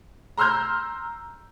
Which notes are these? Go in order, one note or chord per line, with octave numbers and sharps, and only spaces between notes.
A#5 C6 E6 F6 G6